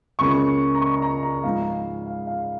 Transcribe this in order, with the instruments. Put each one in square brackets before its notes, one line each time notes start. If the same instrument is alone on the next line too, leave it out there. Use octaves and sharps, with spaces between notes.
[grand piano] C#2 C#3 A#3 C#6
A#5
C#6
A#5
A#5
G#2 F3 G#3 F5
F5
F5